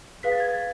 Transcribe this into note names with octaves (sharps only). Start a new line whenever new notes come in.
G#4 B4 F5 B6
A6
G#6
A6